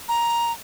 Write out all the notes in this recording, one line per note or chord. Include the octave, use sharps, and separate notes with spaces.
A#5